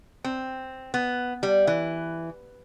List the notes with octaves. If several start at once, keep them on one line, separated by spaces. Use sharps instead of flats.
C4
B3
G3
E3